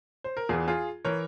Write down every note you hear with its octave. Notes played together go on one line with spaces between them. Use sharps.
C5
A#4
E2 E3 F4 G#4
F4 G#4
E3 A#4 C#5